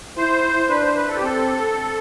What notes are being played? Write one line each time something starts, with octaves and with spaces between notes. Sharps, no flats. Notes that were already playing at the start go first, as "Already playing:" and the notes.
E4 C5
D4 B4
C5
B4
A4
G4
C4 A4